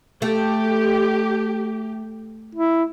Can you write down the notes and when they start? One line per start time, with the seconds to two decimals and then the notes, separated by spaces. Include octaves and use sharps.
0.22 A3 G4
2.55 E4